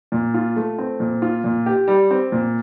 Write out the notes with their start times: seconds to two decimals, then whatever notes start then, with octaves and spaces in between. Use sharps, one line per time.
0.12 A#2
0.34 F4
0.56 A3
0.78 C4
1.00 A#2
1.22 F4
1.44 A#2
1.66 G4
1.88 G3
2.11 C4
2.32 A#2